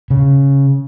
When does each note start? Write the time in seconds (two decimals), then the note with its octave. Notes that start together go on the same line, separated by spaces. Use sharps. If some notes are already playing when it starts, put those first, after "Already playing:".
0.10 C#3